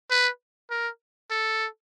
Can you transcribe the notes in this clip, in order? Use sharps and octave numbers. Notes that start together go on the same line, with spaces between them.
B4
A#4
A4